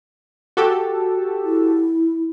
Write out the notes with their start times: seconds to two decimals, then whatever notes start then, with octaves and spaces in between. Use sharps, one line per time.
0.57 F#4 G4 A4
1.44 E4